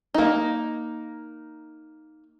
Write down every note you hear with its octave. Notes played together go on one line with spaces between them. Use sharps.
A#3 D#4